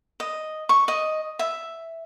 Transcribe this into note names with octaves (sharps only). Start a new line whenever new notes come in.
D#5
C#6
D#5
E5